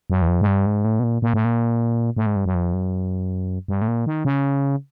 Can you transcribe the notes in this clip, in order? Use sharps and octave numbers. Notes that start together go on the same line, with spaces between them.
F#2
E2
F2
G#2
G2
G#2
A2
B2
A#2
A#2
A2
A#2
A2
G#2
G2
F#2
F2
F#2
G2
A2
A#2
D#3
C#3